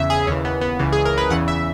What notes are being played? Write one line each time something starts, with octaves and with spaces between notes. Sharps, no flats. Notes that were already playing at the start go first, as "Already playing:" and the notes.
Already playing: E2 C#3 E3 E5
G#4
D#2 C#3 E3 C#4
B3
B3
C#2 C#3 E3
G#4
A#4
B4
E2 C#3 E3 F#5
E5